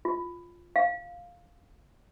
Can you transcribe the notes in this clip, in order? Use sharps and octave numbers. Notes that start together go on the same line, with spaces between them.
F4
F5